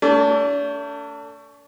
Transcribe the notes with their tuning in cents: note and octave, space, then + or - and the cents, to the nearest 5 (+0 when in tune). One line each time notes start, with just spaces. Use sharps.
A3 +25 D4 -45